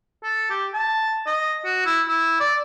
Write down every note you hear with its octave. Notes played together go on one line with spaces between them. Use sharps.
A4
G4
A5
D#5
F#4
E4
E4
D5